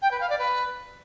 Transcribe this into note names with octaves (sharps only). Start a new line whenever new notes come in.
G5
B4
F5
D5
B4